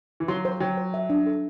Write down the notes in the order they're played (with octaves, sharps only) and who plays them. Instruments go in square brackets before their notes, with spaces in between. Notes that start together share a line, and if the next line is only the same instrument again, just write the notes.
[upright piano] E3
[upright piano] F#3 [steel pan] C6
[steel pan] C5
[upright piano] F#3 [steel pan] G5
[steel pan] C5
E5
D4
A4